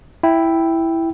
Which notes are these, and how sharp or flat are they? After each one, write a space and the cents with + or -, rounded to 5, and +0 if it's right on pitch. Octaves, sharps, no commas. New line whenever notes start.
E4 +0 G5 +0